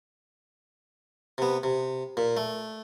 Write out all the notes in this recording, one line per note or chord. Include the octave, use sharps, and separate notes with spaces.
C3 B3
C3
A#2
A3